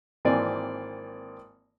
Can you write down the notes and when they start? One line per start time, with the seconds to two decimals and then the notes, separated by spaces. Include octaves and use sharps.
0.25 G#1 E3 A#3 C4 D5 G#5